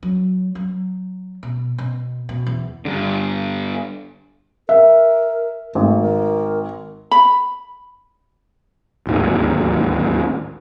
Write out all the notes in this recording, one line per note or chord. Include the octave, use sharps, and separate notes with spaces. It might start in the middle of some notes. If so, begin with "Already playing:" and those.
F#3
F#3
B2
B2
B2
E2
G2 D3
A#4 E5
G#1 A3
A#4
B5
D1 G#1 D#2